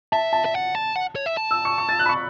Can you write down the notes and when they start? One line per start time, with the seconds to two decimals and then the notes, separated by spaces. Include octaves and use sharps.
0.12 E5 A5
0.33 A5
0.45 E5
0.54 F#5
0.75 A5
0.96 F#5
1.16 C#5
1.26 E5
1.37 A5
1.51 E6
1.65 C#6
1.78 C#6
1.89 A6
1.99 F#6
2.06 B5
2.09 C#6